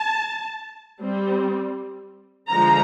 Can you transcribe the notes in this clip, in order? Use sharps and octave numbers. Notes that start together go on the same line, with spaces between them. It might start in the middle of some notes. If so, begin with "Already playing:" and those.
Already playing: A5
G3 C4
D3 F3 G#3 A#5